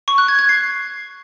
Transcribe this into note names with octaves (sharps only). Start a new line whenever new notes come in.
C#6
F#6
G#6
G#6
C7